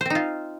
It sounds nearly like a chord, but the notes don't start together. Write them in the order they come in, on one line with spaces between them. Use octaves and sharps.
C5 C4 D#4 F4